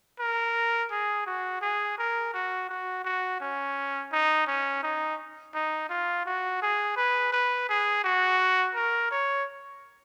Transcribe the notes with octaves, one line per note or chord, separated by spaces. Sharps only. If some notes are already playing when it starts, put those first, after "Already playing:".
A#4
G#4
F#4
G#4
A#4
F#4
F#4
F#4
C#4
D#4
C#4
D#4
D#4
F4
F#4
G#4
B4
B4
G#4
F#4
A#4
C#5